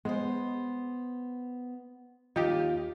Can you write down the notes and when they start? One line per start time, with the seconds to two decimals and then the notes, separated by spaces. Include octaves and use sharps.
0.05 G#3 B3 C5
2.36 D#2 D#4 F4 G4